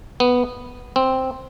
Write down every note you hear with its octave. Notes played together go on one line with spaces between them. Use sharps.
B3
C4